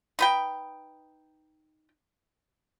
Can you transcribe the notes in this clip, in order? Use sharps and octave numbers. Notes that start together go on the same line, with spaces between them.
D#4 B4 G5